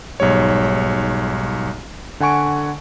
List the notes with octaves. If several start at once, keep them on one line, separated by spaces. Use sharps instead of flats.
B1 G#2 G3 C#5
D3 F#5 G#5 C#6 D7